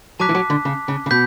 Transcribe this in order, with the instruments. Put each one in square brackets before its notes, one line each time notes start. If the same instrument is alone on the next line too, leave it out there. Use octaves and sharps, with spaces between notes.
[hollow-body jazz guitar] F#3 [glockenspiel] A5 D6 F#6 B6
[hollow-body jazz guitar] E3
F#3
D3
C#3
C#3
C#3
[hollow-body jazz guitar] B2 [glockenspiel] G6 B6